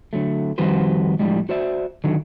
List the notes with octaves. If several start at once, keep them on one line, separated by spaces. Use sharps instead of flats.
D3 F#3 A3
F2 D#3 G3 F#4 B4 C5
A2 D3 F3 G3 G#3
F#4 C5 D5 E5
D3 D#3 F#3